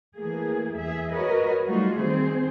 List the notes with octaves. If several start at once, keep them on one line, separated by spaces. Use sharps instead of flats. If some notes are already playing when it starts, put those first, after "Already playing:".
E3 A3 A#3 G#4
E2 G#4 E5
F#4 A#4 B4 C#5 D#5
F#3 G3 A3 D#4 F4 F#4
D#3 C4 G#4 C5